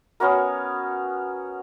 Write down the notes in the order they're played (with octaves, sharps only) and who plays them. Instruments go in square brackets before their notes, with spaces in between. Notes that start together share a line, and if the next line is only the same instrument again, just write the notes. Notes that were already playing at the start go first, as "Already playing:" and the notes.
[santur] B3 C#4 F#4 A#4